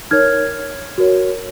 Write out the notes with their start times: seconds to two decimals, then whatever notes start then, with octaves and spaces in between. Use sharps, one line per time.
0.11 D#4 A#4 C#5 F6 G#6
0.98 F#4 A#4 C#5